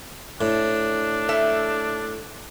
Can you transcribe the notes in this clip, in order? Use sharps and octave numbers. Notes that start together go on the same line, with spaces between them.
A2 D4
A3 E5